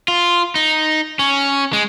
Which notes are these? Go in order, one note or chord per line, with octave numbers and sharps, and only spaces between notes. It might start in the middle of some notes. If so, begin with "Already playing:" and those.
F4
D#4
C#4
G#3